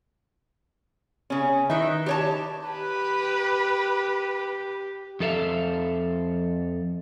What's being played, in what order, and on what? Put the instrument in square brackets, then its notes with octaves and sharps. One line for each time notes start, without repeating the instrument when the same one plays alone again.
[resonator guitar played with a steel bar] C#3 C#4
[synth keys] D#3 D#4 E4 [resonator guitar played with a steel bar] B4 E5
[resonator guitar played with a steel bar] G4 C#5 A5
[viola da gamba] G4 [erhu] B4
[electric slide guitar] F2 A4 E5 F5